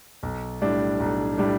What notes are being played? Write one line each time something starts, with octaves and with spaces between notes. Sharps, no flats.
B1
A2 G3 D4
B1
A2 G3 D4